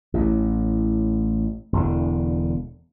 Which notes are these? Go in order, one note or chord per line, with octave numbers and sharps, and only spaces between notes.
A1 A2
E1 E2 D3